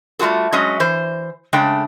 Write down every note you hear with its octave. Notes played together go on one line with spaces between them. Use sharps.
G3 A3 F4 F#4 A4
F#3 G#3 C#4 D#5
E3 C5
C#3 G#3 A3 D4 G5